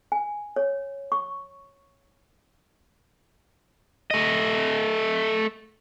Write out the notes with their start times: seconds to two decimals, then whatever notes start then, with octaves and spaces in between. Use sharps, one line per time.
0.12 G#5
0.56 C#5
1.12 C#6
4.11 A3 D#5